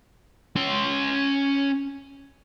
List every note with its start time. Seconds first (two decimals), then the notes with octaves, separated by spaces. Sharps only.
0.56 C#4 C6